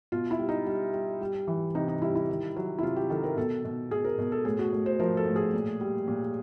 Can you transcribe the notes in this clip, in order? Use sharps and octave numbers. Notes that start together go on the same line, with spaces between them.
B2 F4
E4
G3
D#4
G3
G3
G3
E3
C3 D#4
D#4
G3 E4
E4
D#3
F#3
E4
C3 F4
G4
D#3 A4
A#4
B2 A4
B2
B2 G#4
A#4
B2
A4
A2 G#4
F#4
A2
C5
F3 A#4
A4
A2
G#4
A#2
G3
A#2